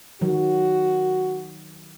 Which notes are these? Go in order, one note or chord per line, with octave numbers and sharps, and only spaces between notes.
D#3 F#3 F#4